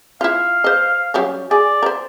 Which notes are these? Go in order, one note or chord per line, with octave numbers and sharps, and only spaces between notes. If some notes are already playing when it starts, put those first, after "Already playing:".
E4 F4 F5
C5 D#5
F#3 G3 C#4
G#4 D5
A#4 C5